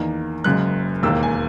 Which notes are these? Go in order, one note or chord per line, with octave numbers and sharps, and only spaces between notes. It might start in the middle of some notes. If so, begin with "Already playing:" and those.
Already playing: E2 D#3 A#3
F#1 F#2 C#3 G#3 F#6
E1 D#2 D#3 A#3 E6
G#5